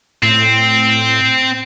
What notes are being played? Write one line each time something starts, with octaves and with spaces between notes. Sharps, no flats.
A2 C4